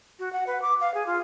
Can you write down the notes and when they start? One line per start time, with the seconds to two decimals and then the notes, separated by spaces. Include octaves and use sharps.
0.19 F#4
0.33 F#5
0.47 B4
0.62 D6
0.81 F5
0.94 G#4
1.06 F4